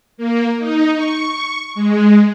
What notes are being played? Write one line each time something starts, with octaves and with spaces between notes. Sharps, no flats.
A#3
D#4
C#6
G#3